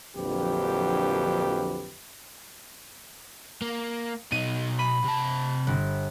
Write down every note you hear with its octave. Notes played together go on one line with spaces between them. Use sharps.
A#1 F2 D3 F#3 G4 B4
A#3
B2 D#4 D#7
B5 D#7
C3 A5
G1